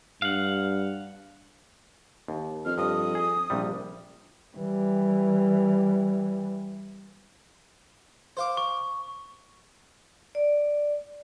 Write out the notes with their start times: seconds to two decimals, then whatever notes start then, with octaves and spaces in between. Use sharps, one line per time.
0.22 G2 F5 F#5
2.28 D#2
2.65 F2 F6
2.78 G2 D#6
3.15 G#4
3.50 A#1 C3 G3
4.55 E3 G3
8.37 C5 F5 D6
8.57 C#6
10.35 D5